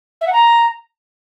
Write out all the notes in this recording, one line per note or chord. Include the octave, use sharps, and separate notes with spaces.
E5
F#5
A#5